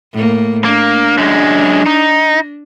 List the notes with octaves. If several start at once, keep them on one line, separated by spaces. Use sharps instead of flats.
A2 A#3
A#3 D4
F#2 G#3
D#4